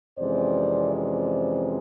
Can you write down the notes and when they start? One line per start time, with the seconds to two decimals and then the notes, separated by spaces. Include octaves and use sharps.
0.18 F2 C3 E3 G#3 C#4 C5 D5
0.95 C5 D5